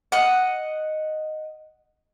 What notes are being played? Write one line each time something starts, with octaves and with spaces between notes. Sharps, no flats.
D#5 F#5